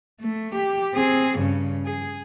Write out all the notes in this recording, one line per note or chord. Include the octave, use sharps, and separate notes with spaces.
A3
G4
C4 G#4
G2 C#3
G#4